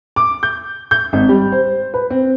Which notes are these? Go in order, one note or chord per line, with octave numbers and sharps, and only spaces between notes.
D6
G6
G6
G#1
G3
C5
B4
C4